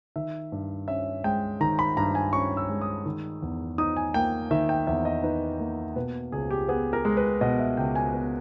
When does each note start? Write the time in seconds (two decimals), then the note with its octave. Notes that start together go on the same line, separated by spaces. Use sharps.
0.16 D#3 E5
0.52 G2
0.88 C#4 E5
1.24 G#3 G5
1.61 D#3 A#5
1.79 B5
1.97 G2 A#5
2.15 G#5
2.33 C#4 C#6
2.57 E6
2.70 G#3
2.82 D#6
3.06 D#3
3.42 E2
3.78 D#4 D#6
3.96 G#5
4.14 A#3 G5
4.51 D#3 E5
4.69 G5
4.87 E2 E5
5.05 D#5
5.23 D#4 B4
5.60 A#3
5.96 B2 B4
6.32 C#2 G#4
6.51 G4
6.69 B3 G#4
6.93 A#4
7.05 G#3
7.17 B4
7.41 B2 D#5
7.59 E5
7.77 C#2 G5
7.95 G#5
8.14 B3